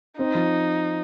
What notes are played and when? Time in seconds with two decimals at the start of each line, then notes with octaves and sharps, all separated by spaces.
0.18 C4 D#4
0.35 F3